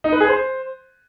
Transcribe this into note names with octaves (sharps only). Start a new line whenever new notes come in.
D#4
B4
G#4
C5